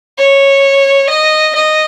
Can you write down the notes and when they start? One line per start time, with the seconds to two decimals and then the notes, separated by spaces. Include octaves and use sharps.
0.18 C#5
1.09 D#5
1.55 D#5